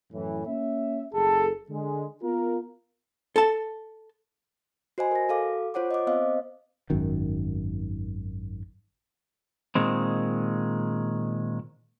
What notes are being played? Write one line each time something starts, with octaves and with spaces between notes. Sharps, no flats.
F#2 A2 E3
A#3 C#4 E5
F#1 G#4 A4
D3 G#3
B3 F4 A#4
A4 A5
F#4 C5 D#5 G#5 B5
A#4 A#6
F#4 A4 F5 D6
F4 C5 C#5 F#5 D6
D#5 D6
B3 C4 C5 D#5 F5
G#1 F#2 D#3
A#2 D#3 G#3 C4